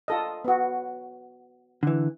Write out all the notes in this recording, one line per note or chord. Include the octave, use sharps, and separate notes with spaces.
F4 A4 D#5
B3 F#4
D3 E3